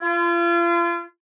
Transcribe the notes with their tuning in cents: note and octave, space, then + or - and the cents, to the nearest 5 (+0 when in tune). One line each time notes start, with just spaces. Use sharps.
F4 -35